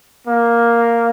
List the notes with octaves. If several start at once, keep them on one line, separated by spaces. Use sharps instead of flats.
A#3